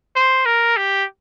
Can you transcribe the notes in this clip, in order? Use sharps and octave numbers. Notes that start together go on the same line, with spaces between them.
C5
A#4
G4